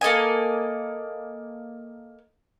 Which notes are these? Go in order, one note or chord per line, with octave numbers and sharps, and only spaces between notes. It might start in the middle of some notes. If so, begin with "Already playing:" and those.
A#3 A4 D#5 G#5